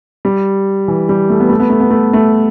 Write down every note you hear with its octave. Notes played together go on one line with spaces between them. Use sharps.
G3
E3
G3
A3
B3
A3
B3
A3
B3
A3
A3